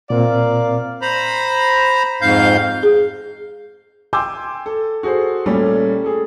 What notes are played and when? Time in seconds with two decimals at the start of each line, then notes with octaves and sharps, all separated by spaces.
0.10 A#2 C4 A#4 D5 F5
1.02 C5 A#5 B5
2.21 F2 G#2 F5 G6
2.83 G#4
4.13 G5 G#5 C6 D6 E6 G6
4.66 A4
5.03 F#4 G#4 A4 C5
5.46 A#2 G3 A3 C#4 A4
6.04 G#4 A4